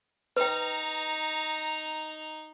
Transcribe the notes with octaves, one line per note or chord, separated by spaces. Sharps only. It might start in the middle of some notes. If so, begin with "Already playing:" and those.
D#4 B4 G5 A#5